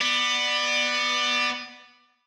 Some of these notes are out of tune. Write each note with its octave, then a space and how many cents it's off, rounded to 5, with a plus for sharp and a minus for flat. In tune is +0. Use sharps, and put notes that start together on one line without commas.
B3 +0 D5 +25